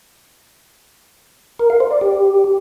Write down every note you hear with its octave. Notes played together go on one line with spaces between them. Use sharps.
A#4
F5
C5
D5
G4